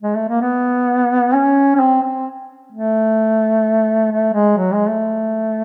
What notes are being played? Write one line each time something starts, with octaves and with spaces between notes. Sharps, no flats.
G#3
A3
A#3
B3
C#4
C#4
C4
C4
A3
A3
G#3
F#3
G#3
A3